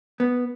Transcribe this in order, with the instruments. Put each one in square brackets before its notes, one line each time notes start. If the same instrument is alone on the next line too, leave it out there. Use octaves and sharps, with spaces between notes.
[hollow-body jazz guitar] B3